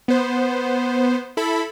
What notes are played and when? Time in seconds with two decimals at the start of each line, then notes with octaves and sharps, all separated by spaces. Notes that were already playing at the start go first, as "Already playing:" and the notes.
0.08 B3 C5
1.37 E4 A4 B5